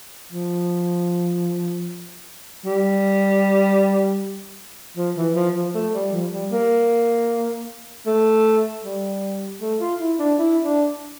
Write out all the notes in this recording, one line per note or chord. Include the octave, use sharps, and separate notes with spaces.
F3
G3
F3
E3
F3
F3
A3
G3
F3
G3
A#3
A3
G3
A3
F4
E4
D4
E4
D4